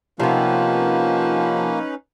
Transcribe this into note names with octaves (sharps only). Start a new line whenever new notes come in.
C3 F3 A#3 B3 C#4 D#4 B4